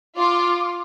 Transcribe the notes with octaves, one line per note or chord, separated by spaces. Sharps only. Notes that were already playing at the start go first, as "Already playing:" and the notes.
F4 D6